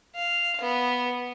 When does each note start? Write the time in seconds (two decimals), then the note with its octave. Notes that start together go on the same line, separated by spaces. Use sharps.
0.15 F5
0.60 B3